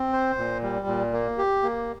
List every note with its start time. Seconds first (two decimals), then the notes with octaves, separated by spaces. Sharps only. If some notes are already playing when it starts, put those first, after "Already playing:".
Already playing: C4
0.13 C5
0.38 A#2
0.63 G3
0.87 A#2
1.13 A#3
1.38 G4
1.63 A#3